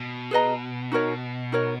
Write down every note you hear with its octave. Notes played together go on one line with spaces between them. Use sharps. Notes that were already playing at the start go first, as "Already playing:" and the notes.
Already playing: B2
G#4 B4 D#5 A#5
D#4 F#4 A#4 C#5
D#4 F#4 A#4 C#5